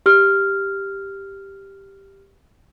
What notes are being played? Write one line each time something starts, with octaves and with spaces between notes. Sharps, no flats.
G4 F6